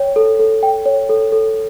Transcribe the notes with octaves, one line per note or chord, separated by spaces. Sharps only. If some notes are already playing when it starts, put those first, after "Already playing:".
Already playing: C#5 G5
A4
A4
G5
C#5
A4
A4